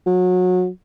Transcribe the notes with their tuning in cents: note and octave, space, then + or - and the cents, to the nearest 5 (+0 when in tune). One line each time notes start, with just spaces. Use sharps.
F#3 -25